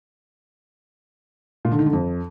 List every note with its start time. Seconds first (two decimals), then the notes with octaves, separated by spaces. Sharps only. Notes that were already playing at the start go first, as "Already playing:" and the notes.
1.65 A#2
1.72 D3
1.79 D#3
1.86 D3
1.93 F2